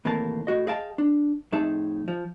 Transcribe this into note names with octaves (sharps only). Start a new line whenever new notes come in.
D#2 A2 C3 E3 A#3 A5
A2 F#4 D#5
G#4 D#5 F5 G5 A5
D4
F2 A2 D#4 G#4 E5 A5
F3